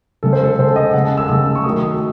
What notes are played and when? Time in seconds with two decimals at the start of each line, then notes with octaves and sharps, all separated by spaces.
0.23 C#3 G#3 A4
0.33 C5
0.44 A4
0.58 C#3 G#3 C5
0.76 D#5
0.94 C#3 G#3 F#5
1.05 A5
1.17 E6
1.29 C#3 G#3 E6
1.55 C#6
1.64 D#3 F#3 A3 D#6
1.83 D#6